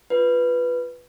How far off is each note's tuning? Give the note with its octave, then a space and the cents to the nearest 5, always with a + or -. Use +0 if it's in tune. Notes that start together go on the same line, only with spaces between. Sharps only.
F4 +0 B4 +0